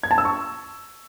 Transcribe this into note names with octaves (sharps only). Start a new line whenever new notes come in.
G#6
A5
E6
C#6